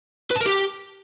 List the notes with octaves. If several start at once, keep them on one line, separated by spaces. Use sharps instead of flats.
B4
A5
A#4
G4